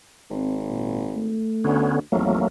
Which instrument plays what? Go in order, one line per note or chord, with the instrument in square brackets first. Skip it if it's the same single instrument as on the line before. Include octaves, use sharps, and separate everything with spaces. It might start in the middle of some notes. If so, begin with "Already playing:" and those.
[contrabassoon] G#1 [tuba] C4
[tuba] A#2
A3
[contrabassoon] D2 [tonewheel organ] D3 B3 C#4
[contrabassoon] G#1 [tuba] E2 [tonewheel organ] F#3 A3 A#3